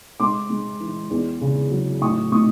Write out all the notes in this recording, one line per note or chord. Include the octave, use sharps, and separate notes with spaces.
G#3 C6 D6
G#3
E3
E2
C#3
F#3
A2 C#6 D#6
A2 C#6 D#6